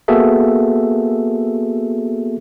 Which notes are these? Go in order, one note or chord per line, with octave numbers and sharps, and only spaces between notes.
A#3 B3 F#4 G#4 A4 E5